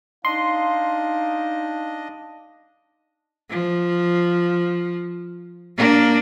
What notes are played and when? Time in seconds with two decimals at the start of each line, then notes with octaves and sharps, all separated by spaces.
0.25 D4 D#4 D#5 F5 C6
3.50 F3
5.77 A#3 D4